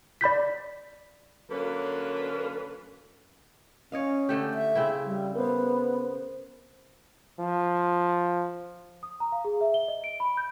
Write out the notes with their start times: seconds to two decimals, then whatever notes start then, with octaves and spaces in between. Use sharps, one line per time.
0.21 D5 B5 G6 B6
1.50 D3 F#3 A#3 C#4 B4
3.92 C#4 C#5 D#5 F5
4.29 D3 A3 G4
4.54 E5
4.75 C#3 C4 E4
5.05 G3
5.35 B3 A#4 C5
7.39 F3
9.03 D#6
9.20 A#5
9.32 F5
9.45 G#4
9.61 E5
9.74 G7
9.88 D#5
10.04 D7
10.20 B5
10.37 G6